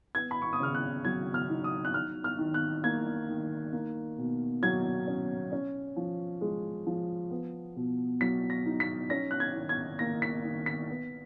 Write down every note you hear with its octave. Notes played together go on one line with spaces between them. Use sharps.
B3 G#6
B5
C#6
D#6
C#3 F6
F#6
F#3 G#6
F6
D#4
D#6
F#6
D#4 F6
F6
D#3
F#6
A#3 G#6
D#3
A#3
B2
F#3 G#6
C#4
C#4
F3
G#3
F3
B3
B2
F#3 B6
A#6
D#4
B6
C#4 A#6
F#6
G#6
D#3
G#6
A#3 A#6
B6
D#3
B6
B3